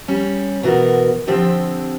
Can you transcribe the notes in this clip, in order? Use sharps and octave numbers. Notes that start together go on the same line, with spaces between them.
G3 C#4
B2 E3 B3 F#4 A#4
D3 F3 C4 G4 G5